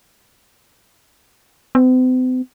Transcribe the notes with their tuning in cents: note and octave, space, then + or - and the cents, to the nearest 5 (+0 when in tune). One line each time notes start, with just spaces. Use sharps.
C4 -45